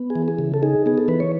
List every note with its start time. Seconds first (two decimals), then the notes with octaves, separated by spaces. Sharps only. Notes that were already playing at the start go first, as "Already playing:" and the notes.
Already playing: B3
0.10 G#4
0.15 E3
0.28 G#4
0.39 C#3
0.54 A4
0.63 D#4 G#4
0.86 B3 G#4
0.98 A4
1.08 E3 B4
1.20 C#5